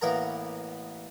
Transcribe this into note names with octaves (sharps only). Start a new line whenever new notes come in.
A1 A#3 B3 A#4 A#5